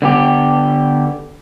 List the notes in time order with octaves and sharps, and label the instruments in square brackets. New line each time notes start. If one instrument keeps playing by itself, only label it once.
[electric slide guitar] D3 B3 G4